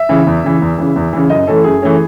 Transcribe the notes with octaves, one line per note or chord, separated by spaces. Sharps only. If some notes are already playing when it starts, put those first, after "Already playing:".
Already playing: E5
C#3 E3
E2
C#3 E3
E2
C#3 E3
E2
C#3 E3
F#2 D#5
E3 A3 C#4 A4
F#2 G#4
E3 A3 C#4